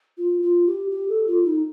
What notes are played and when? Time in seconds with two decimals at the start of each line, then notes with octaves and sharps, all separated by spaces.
0.18 F4
0.43 F4
0.67 G4
0.91 G4
1.09 A4
1.27 F4
1.45 D#4